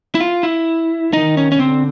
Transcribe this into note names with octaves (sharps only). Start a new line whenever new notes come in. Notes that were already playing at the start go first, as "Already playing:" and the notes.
E4
F4
E4
D#3 D#4
C#4
C#4
D3 C4